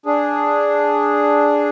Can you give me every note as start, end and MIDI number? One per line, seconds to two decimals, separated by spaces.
0.06 1.70 62
0.06 1.70 68